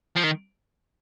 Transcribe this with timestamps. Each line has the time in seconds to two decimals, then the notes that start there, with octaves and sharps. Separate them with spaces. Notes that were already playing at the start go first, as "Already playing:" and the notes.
0.16 F3
0.24 D#3